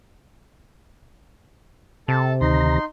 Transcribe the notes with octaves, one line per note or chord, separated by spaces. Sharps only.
C3 A4 A5
D2 D#3 D#4 A#5 C6